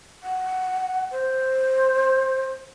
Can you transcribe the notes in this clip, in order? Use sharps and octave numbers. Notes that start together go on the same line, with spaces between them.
F#5
C5